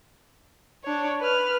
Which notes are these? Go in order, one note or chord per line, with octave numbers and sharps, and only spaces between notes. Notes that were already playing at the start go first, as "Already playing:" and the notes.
D4 C#5
B4 F6